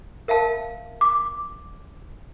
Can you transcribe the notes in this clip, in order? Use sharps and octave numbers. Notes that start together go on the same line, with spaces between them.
A#4 E5 F5 A5
D6